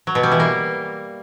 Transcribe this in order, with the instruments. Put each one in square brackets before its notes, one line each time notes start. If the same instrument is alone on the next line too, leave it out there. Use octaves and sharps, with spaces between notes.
[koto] F#3
B2
G3
E3
A#3